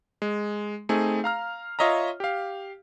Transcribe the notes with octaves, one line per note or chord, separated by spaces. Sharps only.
G#3
A3 C4 D#4 G#4
F5 A#5 F6
F4 C#5 D#5 E5 A#5
G4 F5